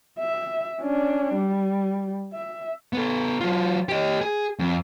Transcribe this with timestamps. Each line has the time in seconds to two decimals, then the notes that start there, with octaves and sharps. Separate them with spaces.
0.19 E5
0.81 C#4 D4
1.35 G3
2.33 E5
2.93 B3 A4
3.40 F#3 F4
3.89 G4 D#5
4.21 G#4
4.59 F2